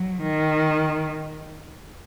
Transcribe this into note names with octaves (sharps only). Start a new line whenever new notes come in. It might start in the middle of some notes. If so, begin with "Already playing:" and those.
Already playing: F#3
D#3